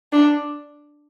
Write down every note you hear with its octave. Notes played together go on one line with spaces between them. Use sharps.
D4